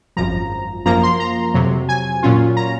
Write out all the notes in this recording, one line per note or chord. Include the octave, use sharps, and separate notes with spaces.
G#1 F#2 F3 A#5
F#2 F3 A#3 A#5
C6
A#5
F2 C3 F#3
G#5
A#2 F#3 C#4 F4
A#5